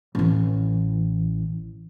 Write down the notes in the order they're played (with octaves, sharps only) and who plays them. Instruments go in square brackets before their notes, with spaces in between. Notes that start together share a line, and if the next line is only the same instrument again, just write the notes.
[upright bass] A1 E3